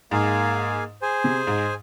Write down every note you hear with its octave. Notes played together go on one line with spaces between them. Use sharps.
G#2 A#3 G#4 F5 G#5
G#4 C5 G#5
C3
G#2